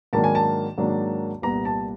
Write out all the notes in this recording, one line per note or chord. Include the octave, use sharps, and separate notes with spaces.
G#2 D#3 F#3 A#3 D4 A5
G#5
A5
G#2 D#3 F#3 A#3 D4
C2 A#2 G3 B3 A#5
A5